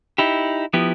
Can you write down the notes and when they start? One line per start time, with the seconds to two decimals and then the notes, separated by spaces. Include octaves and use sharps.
0.18 D#4 E4 G4
0.74 F3 B3 E4 G4